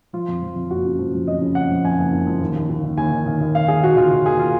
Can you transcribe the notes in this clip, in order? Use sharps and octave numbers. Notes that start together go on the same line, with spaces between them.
F3 F4
F2
F3
F2
F#1 F#4
C#3
F3
F3
F2 D#5
C#3
F2 F#5
F3
F2 G#5
F#1
F#1
F3
D#2
D#2
D#2
D#3
D#2 G#5
D#3
D#3
D#2
D#3 F5
D#3 G#4
D#3 F#4
D#3 F4
D#3
D#2 G#4
F4